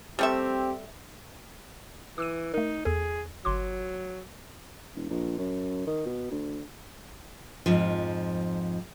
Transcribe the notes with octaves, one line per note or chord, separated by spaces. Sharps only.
G3 A3 C4 G4 E5
E3 D6 E6 D#7
A3 D#4 A#4
E2 G#4 A4
G1 F#3 C6 D6
E1
A#1
F#2
D#3
B2
D2
F2 G#2 F3